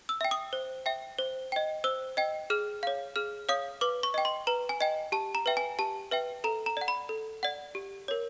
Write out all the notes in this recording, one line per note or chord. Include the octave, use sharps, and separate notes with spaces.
E6
E5 G5
D#6
C5
E5 G5
C5
D#5 G5
C5 E6
D#5 G5
G#4 F6
C#5 F5
G#4 F6
C#5 F5 D#6
B4 D6
C#6
D#5 G5
C6
B4 A#5
G#5
D#5 G5
G4 A5
A#5
B4 E5 G5
G#5
G4 A5
B4 E5 G5
A4 A#5
A#5
D5 F#5
B5
A4
D5 F#5
G4
A#4 C#5